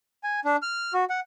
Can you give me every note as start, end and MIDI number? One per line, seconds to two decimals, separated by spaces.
0.23 0.40 80
0.45 0.56 62
0.62 0.93 89
0.93 1.05 66
1.10 1.20 78